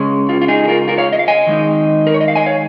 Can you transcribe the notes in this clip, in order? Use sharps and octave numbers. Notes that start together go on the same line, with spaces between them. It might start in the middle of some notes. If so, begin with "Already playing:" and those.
Already playing: C#3 G#3 C#4
F4
F4
D#4 G#4
G#4
F4 A#4
F4 A#4
C#5 F5
D#5
F5
D#5 G#5
D#3 G#3 D#4
A#4
C#5
D#5
F5
D#5 G#5
C#5 F5